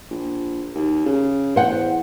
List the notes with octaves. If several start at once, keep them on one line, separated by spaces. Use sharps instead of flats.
A#1
D#2
C#3
E2 C5 F#5 G5